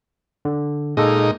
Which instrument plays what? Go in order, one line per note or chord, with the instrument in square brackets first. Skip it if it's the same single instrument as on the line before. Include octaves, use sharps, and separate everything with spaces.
[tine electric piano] D3
[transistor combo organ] A#2 D#4 [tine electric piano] G#3 A#3 A4